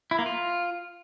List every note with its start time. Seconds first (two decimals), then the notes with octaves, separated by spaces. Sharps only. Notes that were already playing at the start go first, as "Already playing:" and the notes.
0.11 E4
0.19 A#3
0.26 F4